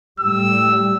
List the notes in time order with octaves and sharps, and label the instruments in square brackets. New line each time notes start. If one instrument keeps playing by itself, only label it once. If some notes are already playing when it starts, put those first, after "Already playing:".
[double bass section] A2 G3 [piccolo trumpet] E6